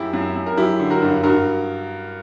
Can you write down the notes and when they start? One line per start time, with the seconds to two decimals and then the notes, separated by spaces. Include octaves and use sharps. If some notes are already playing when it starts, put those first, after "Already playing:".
Already playing: F#2 E4 G4
0.13 F#2
0.36 F#2
0.46 A#4
0.57 F#3 E4 G4
0.80 D3
0.90 F#4 A#4
1.02 G2
1.23 G2 F#4 A#4